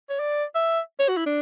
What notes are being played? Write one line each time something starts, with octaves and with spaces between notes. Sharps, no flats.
C#5
D5
E5
C#5
F#4
E4
D4